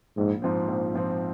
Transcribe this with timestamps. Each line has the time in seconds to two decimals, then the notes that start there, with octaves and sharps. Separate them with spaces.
0.17 A#1 G#2
0.42 G#2 F3 C4
0.68 A#1
0.93 G#2 F3 C4